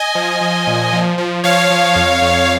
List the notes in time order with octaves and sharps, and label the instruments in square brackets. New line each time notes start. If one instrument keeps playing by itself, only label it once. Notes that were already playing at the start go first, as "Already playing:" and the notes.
Already playing: [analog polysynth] D#5 G#5
F3
F3
A#2
F3
F3
F3 C#5 F5
F3
F2
F2